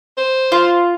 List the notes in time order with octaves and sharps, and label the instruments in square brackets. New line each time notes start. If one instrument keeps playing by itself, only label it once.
[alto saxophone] C5
[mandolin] F4